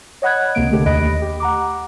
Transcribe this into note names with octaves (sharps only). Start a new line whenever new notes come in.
C#5 D#5 F#5 B5 F#6 G#6
C#2 C3 A#3 D7
D3 A3 G4
D#2 D#5 B5 F#6 A#6 D7
G4
F#5 A#5 D6